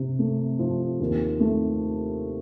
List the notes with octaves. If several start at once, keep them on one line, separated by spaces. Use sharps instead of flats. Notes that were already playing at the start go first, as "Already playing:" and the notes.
Already playing: C3
A3
F3
D#2
A3